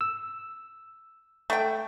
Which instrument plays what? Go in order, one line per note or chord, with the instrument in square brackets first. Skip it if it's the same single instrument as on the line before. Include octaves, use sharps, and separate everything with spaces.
[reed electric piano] E6
[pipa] A3 G5